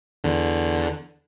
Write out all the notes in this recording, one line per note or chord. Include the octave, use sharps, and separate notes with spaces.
E2 D3